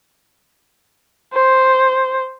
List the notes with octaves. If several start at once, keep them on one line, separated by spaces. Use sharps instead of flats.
C5